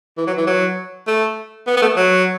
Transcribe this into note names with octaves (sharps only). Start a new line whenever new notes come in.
E3
F#3
E3
F#3
A3
B3
B3
A3
F#3